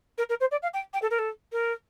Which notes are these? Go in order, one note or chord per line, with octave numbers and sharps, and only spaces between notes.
A#4
A#4
C5
D5
F5
G5
G5
A4
A#4
A4
A#4